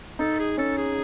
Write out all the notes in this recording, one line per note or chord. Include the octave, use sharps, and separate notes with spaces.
D#4 A4
G#4
C#4 A4
G#4